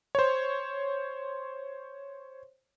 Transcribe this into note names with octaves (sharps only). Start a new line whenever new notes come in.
C5 C#5